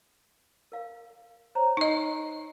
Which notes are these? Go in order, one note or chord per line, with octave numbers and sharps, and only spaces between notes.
A#4 F5
C5 C#5 A#5
D#4 D#5